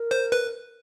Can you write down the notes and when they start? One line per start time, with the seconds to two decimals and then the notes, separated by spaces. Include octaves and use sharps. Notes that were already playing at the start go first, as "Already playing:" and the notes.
Already playing: A#4
0.11 C5
0.32 B4